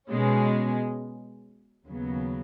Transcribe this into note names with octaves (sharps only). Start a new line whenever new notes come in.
B2 G#3 C#4
D#2 C#3 F#3 B3